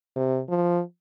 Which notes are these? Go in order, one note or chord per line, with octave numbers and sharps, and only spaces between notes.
C3
F3